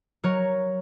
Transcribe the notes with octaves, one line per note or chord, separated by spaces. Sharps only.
F#3 A#4 C#5